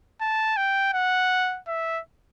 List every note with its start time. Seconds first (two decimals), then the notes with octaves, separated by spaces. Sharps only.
0.22 A5
0.57 G5
0.93 F#5
1.68 E5